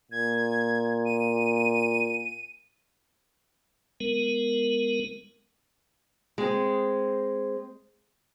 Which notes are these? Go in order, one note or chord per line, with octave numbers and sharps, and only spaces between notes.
A#2 G#6
D#7
G#3 B3 A#4
G#3 C4